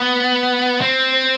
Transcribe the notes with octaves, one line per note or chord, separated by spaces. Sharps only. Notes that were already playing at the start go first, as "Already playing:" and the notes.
Already playing: B3
C4